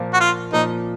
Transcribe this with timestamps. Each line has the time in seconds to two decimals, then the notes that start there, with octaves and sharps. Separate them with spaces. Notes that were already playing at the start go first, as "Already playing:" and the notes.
Already playing: A#2 F3 A#3
0.14 F#4
0.20 F4
0.53 A#2 F3 A#3 D#4